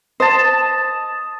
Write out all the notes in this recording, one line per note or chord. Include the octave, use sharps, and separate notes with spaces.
C5 D#5 A5